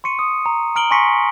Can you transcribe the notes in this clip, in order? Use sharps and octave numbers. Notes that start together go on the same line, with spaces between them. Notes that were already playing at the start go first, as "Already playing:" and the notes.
C6 C#6 C#7 D#7
D#6
A#5
A#5 F6 D7 F#7 G7
G#5 C6 C#6 A#6 B6 C#7